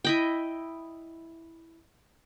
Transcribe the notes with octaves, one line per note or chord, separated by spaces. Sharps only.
E4 D#5 G5